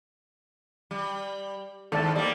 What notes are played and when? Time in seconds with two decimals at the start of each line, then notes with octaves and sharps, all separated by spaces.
0.91 G3
1.92 D#2 G#2 A4 D5 A5
2.16 G3 A#3 D5 D#5